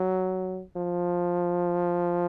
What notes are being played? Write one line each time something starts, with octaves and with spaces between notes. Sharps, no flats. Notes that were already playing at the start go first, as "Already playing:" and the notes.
Already playing: F#3
F3